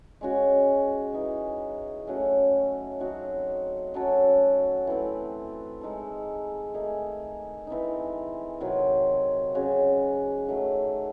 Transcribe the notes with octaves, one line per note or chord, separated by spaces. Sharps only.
G#3 C#4 F#4
E3 G#3 D#4 G#4
F#3 A3 C#4 F#4
F#3 C4 D#4 F#4
F#3 C#4 F#4 A4
E3 A3 C4
G#3 D#4 A4
D#3 A3 D#4 G#4
E3 C4 D#4
C3 D#3 F#3 C4
C#3 F#3 C#4 F#4
D#3 F#3 A3